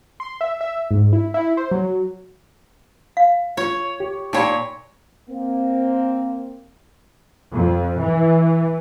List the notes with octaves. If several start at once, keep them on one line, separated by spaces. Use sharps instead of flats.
C6
E5
E5
G#2
E4
E4
C5
F#3
F5
F4 C#5
G4
A#2 D#4 C#5 G5 B5
A#3 C4
F2
E3